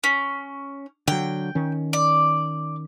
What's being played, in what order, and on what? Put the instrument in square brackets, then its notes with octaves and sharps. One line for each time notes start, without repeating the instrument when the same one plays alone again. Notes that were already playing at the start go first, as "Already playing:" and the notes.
[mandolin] C#4
[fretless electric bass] D3 F#3 [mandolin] G5
[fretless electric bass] D#3 C#4
[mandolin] D5